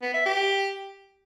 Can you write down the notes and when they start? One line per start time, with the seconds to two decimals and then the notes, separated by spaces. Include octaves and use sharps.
0.02 B3
0.14 E5
0.26 G4